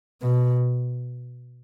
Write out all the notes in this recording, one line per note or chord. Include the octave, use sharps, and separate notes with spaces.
B2